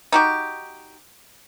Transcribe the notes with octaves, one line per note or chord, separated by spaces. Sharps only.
D#4 F#4 G4